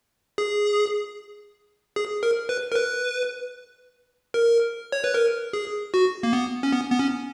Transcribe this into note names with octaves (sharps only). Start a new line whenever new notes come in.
G#4
G#4
A#4
B4
A#4
B4
A#4
C#5
B4
A#4
G#4
F#4
A#3
B3
C#4
B3
B3
C#4